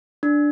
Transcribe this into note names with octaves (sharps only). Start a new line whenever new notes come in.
D4